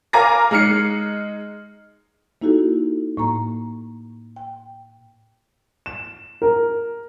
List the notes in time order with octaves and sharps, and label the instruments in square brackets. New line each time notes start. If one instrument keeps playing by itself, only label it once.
[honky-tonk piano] A#4 F5 G#5 A#5 D6 A#6
G#3 D#4 F6 C7 C#7
[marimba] A#3 D#4 E4 F#4 G4 A4
A2 A#3 A#5
G5
[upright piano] E7
A#4